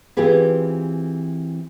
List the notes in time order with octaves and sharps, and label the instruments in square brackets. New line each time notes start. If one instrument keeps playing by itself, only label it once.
[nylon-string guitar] E3 C4 F4 G4 G#4 B4